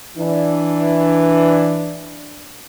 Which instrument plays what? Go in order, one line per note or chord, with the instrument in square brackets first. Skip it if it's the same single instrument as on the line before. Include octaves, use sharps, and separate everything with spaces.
[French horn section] E3 D4